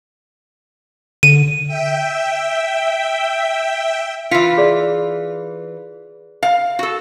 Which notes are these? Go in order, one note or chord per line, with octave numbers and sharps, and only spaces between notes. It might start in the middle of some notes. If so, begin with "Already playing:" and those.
D3 D#7
E5 G5
E3 F4 B6 C#7
G#4 D5
F5
F#4 A4